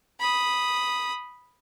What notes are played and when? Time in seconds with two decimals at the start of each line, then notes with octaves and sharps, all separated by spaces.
0.20 B5 D#6